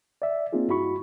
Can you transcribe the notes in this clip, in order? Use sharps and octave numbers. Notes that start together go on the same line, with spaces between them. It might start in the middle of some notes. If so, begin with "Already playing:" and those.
D5 E5
A#3 C4 D#4 F4 G#4
G2 E4 F#4 B5 C#6